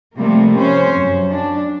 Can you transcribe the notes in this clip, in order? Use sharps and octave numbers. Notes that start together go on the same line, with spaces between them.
C3 F3 G3 A3 A#3
C#4 C5
F#2
D4